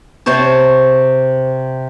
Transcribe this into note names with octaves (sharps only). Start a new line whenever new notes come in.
C3 C5 C#5 A5